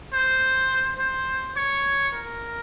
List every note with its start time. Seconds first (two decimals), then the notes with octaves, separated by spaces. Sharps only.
0.13 C5
0.99 C5
1.56 C#5
2.13 A#4